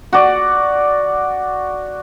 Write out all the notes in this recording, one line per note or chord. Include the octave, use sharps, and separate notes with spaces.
F#4 D5